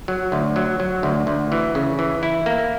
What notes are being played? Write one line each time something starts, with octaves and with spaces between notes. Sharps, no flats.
F#3
D2
F#3
F#3
D2
D2
E3
C#3
E3
E4
A#3